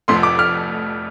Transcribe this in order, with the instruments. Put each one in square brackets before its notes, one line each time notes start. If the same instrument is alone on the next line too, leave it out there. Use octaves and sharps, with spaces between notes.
[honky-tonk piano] F1 F2 F3 A3 [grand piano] C6
[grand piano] D6
F6